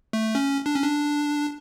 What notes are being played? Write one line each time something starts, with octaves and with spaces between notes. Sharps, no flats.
A3
C#4
D4
C#4
D4